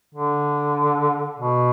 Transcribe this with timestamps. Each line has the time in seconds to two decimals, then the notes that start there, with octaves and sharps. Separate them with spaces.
0.15 D3
1.38 B2